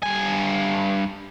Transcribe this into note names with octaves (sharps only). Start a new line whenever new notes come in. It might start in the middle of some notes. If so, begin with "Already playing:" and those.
G2 G#5